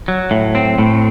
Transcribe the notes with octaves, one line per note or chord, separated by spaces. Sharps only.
F#3
A2
C4
A2